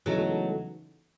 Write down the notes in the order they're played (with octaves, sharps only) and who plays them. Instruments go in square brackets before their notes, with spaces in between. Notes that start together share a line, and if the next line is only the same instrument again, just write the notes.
[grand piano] C#3 E3 G#3 B3 D#4 [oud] F#3 A3